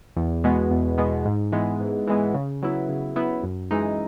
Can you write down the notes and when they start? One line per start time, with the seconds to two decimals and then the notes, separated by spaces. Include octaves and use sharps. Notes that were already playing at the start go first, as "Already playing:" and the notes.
0.16 E2
0.44 B2 G#3 B3
0.71 E2
0.98 B2 G#3 B3
1.25 G#2
1.52 E3 G#3 B3
1.80 G#2
2.07 E3 G#3 B3
2.34 C#3
2.62 F#3 B3 E4
2.89 C#3
3.16 F#3 B3 E4
3.43 F#2
3.71 E3 G#3 D#4